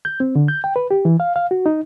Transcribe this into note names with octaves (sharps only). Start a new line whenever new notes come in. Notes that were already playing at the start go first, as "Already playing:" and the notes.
G6
C4
D3
G6
G5
B4
G4
E3
F5
F5
F#4
D#4